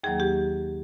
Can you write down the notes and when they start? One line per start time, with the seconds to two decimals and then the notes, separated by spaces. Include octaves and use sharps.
0.03 D#2 D#3 F#3 A#3 G#4
0.20 G4